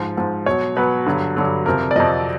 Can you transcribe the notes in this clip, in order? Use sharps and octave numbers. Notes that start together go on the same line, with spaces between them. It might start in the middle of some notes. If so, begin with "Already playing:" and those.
Already playing: G#2 F3
G#2 F3
B2 F#3 C#5
B2 F#3 B4
G2 D3 F#3
G2 D3 F#3
F2 C3 F3 A#4
D5
F2 C3 F3 D#5